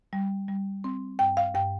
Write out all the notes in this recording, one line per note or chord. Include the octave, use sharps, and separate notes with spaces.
G3
G3
C4
G2 G5
F5
G2 G5